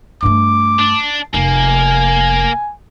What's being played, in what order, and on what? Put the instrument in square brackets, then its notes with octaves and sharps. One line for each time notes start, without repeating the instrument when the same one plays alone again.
[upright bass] G2 A3 [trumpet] D6
[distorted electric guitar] D4
[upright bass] F1 [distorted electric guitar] A#3 [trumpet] G#5